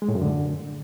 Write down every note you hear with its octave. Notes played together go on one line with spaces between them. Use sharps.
G#3
A2
F#2
D3